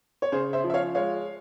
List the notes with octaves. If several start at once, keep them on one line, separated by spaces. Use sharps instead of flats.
C#5
C#3 G#4 C5
C5 E5
F3
E5
C#5 F5
G#3 C#5 F5